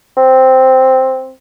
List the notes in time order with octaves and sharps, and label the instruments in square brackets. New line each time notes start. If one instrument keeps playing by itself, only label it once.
[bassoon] C4